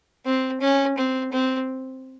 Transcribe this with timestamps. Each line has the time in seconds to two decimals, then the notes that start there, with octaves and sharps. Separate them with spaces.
0.25 C4
0.61 C#4
0.97 C4
1.32 C4